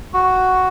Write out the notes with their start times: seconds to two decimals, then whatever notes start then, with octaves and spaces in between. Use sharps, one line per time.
0.13 F#4